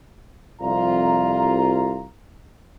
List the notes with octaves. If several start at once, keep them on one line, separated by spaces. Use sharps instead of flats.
C2 F2 F4 A#5